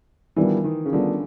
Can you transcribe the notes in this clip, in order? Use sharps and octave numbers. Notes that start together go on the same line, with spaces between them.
D#3 E3 G3 B3 D4 F4
D#3
C#3
D3 D#3 G3 B3 D4 F4